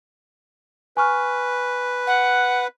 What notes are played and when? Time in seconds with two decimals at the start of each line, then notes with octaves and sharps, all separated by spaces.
0.97 B4 G#5 C#6 F6
2.07 F#5